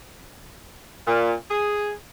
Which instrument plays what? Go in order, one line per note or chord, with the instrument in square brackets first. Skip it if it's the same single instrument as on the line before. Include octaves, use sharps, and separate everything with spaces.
[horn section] A#2
G#4